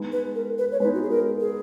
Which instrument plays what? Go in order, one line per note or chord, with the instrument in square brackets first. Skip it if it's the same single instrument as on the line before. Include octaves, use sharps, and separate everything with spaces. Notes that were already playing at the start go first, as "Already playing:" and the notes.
Already playing: [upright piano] G#3 B3 D#4
[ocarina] B4
A#4
B4
C#5
[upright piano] G#3 B3 D#4 [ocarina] B4
[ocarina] F#4
G#4
A#4
G#4